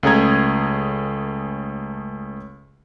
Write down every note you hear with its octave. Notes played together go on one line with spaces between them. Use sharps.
C#2 A3 C#4 G#4 A#5 G#6